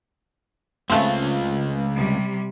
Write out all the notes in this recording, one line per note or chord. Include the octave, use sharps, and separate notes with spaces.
C#2 C#3 A3 C4 F4
C3 G3